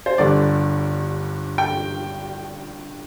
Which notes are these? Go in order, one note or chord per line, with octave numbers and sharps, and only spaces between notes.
C5
G1 G2 D3 D5
G5